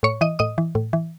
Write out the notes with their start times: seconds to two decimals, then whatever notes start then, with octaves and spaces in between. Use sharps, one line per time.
0.03 A2 C#5 C#6
0.21 E3 D#5 D#6
0.39 A2 D#5 D#6
0.58 E3
0.75 A2
0.93 E3